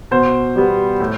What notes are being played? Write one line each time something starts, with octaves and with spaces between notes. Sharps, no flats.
B2 C5
G3 B3
A2